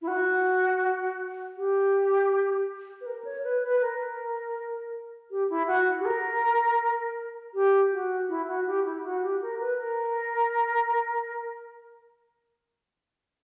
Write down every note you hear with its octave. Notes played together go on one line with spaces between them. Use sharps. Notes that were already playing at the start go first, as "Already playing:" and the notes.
E4
F#4
G4
B4
A#4
C#5
B4
B4
A#4
G4
E4
F#4
G4
A#4
G4
F#4
E4
F#4
G4
E4
F#4
G4
A#4
B4
A#4